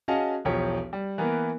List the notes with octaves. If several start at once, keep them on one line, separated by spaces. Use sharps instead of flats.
C#4 F#4 G#4 D#5 F5 A5
E1 B1 F3 G4 C#5
G3
E3 A#3 B3 A#4